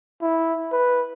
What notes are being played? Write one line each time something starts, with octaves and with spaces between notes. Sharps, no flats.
E4
B4